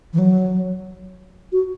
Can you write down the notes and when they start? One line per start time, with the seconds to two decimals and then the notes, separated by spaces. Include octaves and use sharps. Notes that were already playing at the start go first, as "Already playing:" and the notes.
0.13 E3
0.18 F#3
1.52 F#4